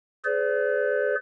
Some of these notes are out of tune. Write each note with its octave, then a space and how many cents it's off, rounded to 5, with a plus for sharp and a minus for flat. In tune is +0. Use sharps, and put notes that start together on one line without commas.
G#4 +15 B4 +45 D5 -35